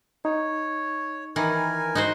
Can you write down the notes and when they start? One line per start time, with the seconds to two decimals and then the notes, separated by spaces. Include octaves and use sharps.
0.25 D#4 C#5
1.36 D#3 E3 A#4 G#5
1.95 G#2 D#4 F#4 C5